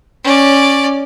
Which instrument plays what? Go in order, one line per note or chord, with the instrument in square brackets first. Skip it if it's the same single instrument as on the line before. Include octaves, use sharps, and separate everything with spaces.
[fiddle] C#4 D5